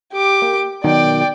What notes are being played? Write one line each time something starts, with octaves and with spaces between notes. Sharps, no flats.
G4 D6
A#3
B2 D#3 F#3 D5 G5